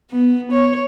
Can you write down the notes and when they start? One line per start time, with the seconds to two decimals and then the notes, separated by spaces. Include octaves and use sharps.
0.11 B3
0.52 C#5